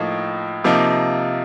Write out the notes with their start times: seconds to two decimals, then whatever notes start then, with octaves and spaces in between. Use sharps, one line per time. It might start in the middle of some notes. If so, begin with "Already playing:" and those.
Already playing: A2 F3 A#3 D#4
0.64 C3 F3 A#3 D#4